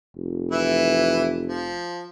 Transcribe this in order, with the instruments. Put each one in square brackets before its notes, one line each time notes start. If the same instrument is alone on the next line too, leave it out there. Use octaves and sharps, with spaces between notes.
[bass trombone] F1
[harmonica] E3 E4
F3